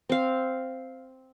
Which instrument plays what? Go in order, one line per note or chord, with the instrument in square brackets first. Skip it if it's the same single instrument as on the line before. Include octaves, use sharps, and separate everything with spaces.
[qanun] C4 F5